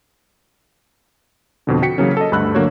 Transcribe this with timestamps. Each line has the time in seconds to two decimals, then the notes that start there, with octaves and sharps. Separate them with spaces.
1.67 F2 B2 D3
1.82 F#4 G5 B6 C#7
1.98 C#3 E3 F#3 A#3 C#4
2.17 A4 D#5
2.32 D2 G2 D3 B5 E6 F#6
2.55 D3 F#3 A#3 F#4 C#5